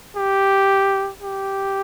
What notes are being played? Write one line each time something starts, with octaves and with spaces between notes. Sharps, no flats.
G4
G4